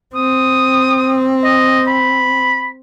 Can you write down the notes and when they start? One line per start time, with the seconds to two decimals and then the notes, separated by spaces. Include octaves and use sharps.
0.15 C4 D#6
1.45 D#5
1.87 B5